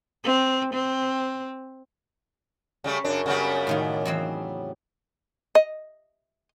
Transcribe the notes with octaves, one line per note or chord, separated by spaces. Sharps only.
C4
C4
C#3 G3 A3
F#2 C#3 D4
C#3 G3 B3
A2 D#3 F4
E2 F#3 C4
D#5